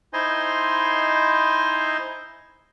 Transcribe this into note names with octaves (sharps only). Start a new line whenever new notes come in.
D#4 E4 C5 D#5 G#5 C6